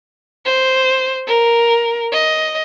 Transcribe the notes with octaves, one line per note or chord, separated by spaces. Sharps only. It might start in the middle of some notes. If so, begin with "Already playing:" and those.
C5
A#4
D#5